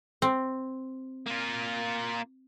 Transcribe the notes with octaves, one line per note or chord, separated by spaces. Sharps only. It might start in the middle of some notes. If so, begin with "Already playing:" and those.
C4
A#3 F4